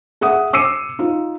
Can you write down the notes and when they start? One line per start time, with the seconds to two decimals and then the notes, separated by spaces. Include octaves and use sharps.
0.21 G#4 E5 F#5 D#6
0.53 D6 E6 C7 C#7 D#7
0.99 D#4 F4